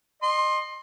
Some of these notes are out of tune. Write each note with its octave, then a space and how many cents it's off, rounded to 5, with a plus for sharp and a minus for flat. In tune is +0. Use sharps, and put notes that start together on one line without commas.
D#5 -25 C6 +20